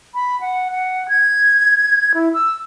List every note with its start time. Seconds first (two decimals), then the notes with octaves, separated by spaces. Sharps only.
0.14 B5
0.41 F#5
0.71 F#5
1.09 G#6
2.14 E4
2.33 E6